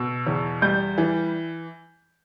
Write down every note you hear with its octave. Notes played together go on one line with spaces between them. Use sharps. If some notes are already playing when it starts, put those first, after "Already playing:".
Already playing: B2 E6
E2
G3 G6
E3